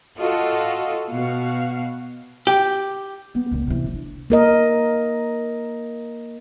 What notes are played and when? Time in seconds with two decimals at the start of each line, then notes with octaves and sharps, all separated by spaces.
0.19 F4 F#4 A4 D#5
1.12 B2 F#4 F5
2.47 G4
3.35 B3
3.51 C#2 A#2
3.68 C3 E3
3.94 D4
4.30 A#3 A#4 D#5